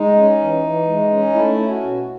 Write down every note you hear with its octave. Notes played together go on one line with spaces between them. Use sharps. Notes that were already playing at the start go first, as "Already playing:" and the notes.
Already playing: G#3 D#4
C#4
E3
E3
G#3
C#4
A3 E4
C#4
F#4
B2